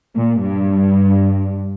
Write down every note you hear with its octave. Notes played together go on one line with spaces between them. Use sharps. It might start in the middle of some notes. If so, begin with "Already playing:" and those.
A#2
G2